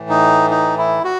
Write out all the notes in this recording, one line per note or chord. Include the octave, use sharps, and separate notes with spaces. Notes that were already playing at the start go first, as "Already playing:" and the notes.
Already playing: A2 E3
D#4
D#4
E4
F#4